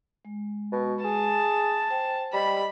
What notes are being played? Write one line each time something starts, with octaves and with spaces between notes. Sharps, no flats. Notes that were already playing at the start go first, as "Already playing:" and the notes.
G#3
B2
G#4 A5
C5 G5
G3 D#5 B5